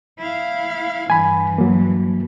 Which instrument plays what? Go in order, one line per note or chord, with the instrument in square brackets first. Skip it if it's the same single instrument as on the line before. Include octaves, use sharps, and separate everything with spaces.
[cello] E4 F5
[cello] G2 E3 [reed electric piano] G#5 B5
[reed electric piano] F#3 A#3